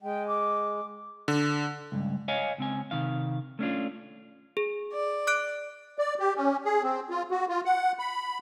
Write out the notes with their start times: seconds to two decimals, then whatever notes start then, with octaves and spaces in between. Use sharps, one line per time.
0.03 G#3 G5
0.27 D6
1.28 D3
1.92 C#2 G2
2.28 C#5 D#5 F5 G#5
2.58 C#2 C4 G#5
2.91 C3 D#3 F5
3.59 A3 C#4 D4 F4
4.57 G#4
4.92 D5
5.27 D6 F#6 D7
5.98 D5
6.20 G4
6.37 C#4
6.65 G#4
6.83 C4
7.10 F4
7.31 F#4
7.49 F4
7.65 F#5
7.99 B5